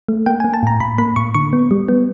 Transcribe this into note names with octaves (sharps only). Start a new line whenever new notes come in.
A3
A#3 G5
A#3 G#5
A5
A2 A#5
A2 B5
A#3 B5
A2 C#6
D3 C#6
B3
G3
B3